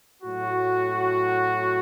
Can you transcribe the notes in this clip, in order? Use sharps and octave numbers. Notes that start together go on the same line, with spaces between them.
A2 F#3 F#4